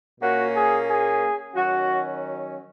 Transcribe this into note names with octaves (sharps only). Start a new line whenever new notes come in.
A#2 A#3 C#4 F#4
G#4
G#4
D#3 F#3 C#4 F#4